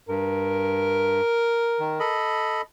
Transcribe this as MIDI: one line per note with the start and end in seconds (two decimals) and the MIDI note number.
0.09 1.21 43
0.09 2.15 70
1.80 1.99 51
2.00 2.62 69
2.00 2.62 75
2.00 2.62 83